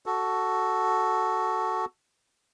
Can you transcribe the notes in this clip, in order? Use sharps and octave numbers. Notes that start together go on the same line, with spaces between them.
F#4 A4